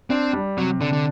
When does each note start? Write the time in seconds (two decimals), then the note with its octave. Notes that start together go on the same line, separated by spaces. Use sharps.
0.10 C4 D4
0.33 G3
0.57 C3 F#3
0.81 D3 D4
0.93 D3